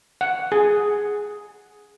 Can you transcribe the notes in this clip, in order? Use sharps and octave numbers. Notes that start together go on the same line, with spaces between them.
F#5
G#4